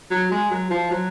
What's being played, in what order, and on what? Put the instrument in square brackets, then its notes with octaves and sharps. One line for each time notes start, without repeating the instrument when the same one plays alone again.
[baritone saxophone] F#3
G#3
F#3
F3
F#3